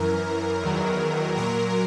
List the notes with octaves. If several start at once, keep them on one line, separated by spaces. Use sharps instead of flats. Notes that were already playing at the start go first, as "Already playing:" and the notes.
Already playing: F#2 E3 A#4
E2 D#3 F#3
A#2 F#3 A#4